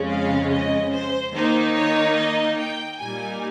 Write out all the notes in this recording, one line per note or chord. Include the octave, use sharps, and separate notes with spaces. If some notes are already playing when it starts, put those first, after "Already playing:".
Already playing: F2 C#3 G#3 C#4
F5
D#5
C5
D#3 A#3 D#4 C5
C#5
D#5
G5
A#2 G3 A#3 D#4 G#5